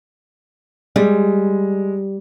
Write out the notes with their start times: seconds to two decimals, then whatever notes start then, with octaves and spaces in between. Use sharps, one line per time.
0.96 G3 G#3